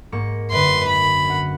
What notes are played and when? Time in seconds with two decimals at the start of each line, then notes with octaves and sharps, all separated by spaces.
0.12 G#2 A#3 C#6
0.51 F#2 D3 B4 C6
0.88 B5
1.26 C#4 F#5